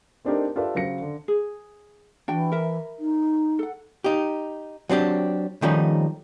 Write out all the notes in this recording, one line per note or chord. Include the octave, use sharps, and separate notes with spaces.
A3 C4 D4 D#4 G4 A#4
F4 G4 A4 B4 D5 E5
C#3 F#3 C5 A#6 C#7
D3
G#4
E3 D4 F#4 G5
A#4 E5
D#4
A4 F#5
D#4 G4
F#3 C4 D4 G4
D#3 F3 G3 A3 C#4 D#4